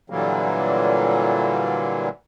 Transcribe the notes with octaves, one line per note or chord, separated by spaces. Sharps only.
A#2 D3 E3 F#3 G3 A#3